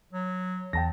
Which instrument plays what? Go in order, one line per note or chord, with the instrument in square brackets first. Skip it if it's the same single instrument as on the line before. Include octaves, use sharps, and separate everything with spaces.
[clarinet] F#3
[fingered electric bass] E2 [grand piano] G5 A5 A#6